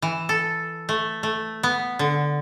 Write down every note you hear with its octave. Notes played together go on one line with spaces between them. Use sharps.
E3
A4
A3
A3
B3
D3